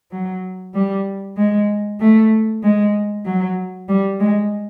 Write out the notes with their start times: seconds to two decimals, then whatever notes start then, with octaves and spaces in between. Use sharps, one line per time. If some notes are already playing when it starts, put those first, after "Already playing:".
0.11 F#3
0.74 G3
1.37 G#3
2.00 A3
2.63 G#3
3.25 F#3
3.89 G3
4.20 G#3